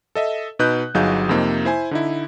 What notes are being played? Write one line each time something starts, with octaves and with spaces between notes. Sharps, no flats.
A4 D#5 E5
B2 D#4 B4 F#6 G6
G1 F#3 D#4 G#4 F5 G6
F2 C3 A#3 D#4
E4 C5 G#5
D3 D#4 E4